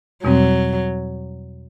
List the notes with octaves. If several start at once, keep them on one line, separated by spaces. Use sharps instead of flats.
E2 B2 F#3 G3 C4